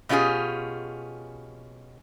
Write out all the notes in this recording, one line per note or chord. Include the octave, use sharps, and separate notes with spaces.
B2 C#4 F4 G4 G#4